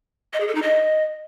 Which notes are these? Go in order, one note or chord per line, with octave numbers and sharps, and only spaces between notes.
D#5
G#4
A4
D#4
D#5